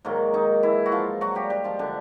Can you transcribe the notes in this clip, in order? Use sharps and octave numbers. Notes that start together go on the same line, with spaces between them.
G#2 D#3 F#3 A#3
D#3 D#4
E3 E4
F#4
F3 F4
F#3 F#4
G3 G4
G3 G4
F3 F4
D3 D4